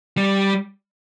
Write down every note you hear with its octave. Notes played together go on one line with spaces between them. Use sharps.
G3